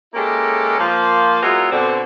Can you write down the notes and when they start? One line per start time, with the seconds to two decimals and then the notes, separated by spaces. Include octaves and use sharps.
0.14 G#3 A#3 C#4 E4 G4 A4
0.79 F3 A#3
1.42 F#3 G#3 B3 E4 F4 A#4
1.71 B2 D3 C4